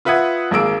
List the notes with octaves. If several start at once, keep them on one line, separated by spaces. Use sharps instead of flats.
F4 B4 E5 F#5 D#6 G#6
G#1 A#3 G#4 E6 D7